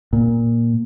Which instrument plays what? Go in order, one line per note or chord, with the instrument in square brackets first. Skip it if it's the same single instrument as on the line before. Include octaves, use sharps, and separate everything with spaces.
[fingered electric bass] A#2